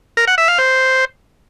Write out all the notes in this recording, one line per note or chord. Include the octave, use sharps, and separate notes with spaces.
A#4
F#5
E5
F5
C5